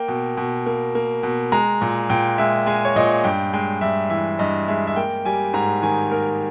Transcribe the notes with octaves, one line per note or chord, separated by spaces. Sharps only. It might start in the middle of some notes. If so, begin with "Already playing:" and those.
Already playing: A#3 G5
B2
B2
A#3
A#3
B2
G#3 A#5
A#2
A#2 G5
G#3 E5
G#3 G#5
C#5
A#2 D#5
G2 G5
G#3 G5
G2 E5
E3 E5
G2 D#5
G#3 E5
E5
A#3 G5
G3 G#5
G#2 A#5
D#3 G#5
A#3 A#4